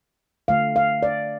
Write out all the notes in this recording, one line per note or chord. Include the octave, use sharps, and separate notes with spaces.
D3 A3 F5
F5
D5